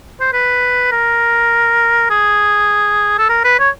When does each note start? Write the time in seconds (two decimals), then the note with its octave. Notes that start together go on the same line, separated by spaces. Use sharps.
0.21 C5
0.33 B4
0.92 A#4
2.10 G#4
3.18 A4
3.29 A#4
3.44 B4
3.60 C#5